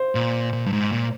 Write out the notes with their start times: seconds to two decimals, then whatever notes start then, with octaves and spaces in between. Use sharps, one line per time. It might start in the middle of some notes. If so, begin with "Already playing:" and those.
Already playing: C5
0.15 A#2
0.53 A#2
0.66 G2
0.73 G#2
0.92 A#2